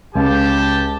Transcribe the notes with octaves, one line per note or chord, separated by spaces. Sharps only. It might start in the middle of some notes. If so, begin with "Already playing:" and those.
C#2 C#4 G4 F5 A5